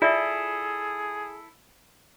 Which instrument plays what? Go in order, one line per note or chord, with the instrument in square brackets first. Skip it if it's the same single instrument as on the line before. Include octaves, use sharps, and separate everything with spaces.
[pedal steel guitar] E4 A4 [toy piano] F4 D5 E5 [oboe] G#4